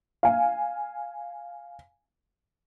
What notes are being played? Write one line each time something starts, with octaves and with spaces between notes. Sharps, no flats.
F5 G#5